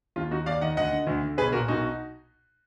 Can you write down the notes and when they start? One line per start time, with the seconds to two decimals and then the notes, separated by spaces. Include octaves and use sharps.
0.16 D#2 F4
0.31 D#3 D#4 F#4
0.46 D#2 D5 F5
0.61 D#3 D#5 F#5
0.77 D2 D#5 F#5
0.92 D3
1.07 D2
1.23 D3
1.38 B1 G#4 B4
1.52 A#2 F#4 A#4
1.68 B1 D#4 F#4